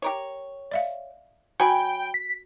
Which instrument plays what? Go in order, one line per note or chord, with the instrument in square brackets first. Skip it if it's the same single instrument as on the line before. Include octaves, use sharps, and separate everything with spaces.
[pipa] G4 A#4 C#5
[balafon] D5 E5 F5
[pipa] F#3 G#5 B5 [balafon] F#4 [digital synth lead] G5
[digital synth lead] B6